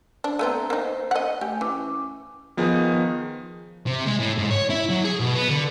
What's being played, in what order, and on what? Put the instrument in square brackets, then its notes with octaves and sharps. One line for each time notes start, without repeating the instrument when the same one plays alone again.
[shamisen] D4 [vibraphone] C5
[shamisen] A3 B3 C4 [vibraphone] A4 A#5
[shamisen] A#3 D#4 [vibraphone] C5
[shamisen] D#5 F#5
[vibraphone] A3 G#5 [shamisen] G4
[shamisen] E3 [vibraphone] C#4 D6
[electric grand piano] D#3 F3 B3 D#4 G#4
[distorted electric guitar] C3
G#3
A2
G#2
C#5
E4
F#3
G#4
B2
B3
D3